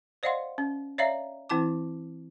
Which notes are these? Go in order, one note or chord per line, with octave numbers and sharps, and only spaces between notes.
C5 D5 D#5 F5 F#5 C6
C#4
C#5 D5 E5 F5 A#5
E3 C4 E4 A5 D6